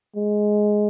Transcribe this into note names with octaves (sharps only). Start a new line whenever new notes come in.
G#3